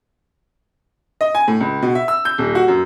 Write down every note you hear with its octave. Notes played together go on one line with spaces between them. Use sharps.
D#5
G#5
A2
C#2
B2
E5
E6
G6
D#1
F#4
F#2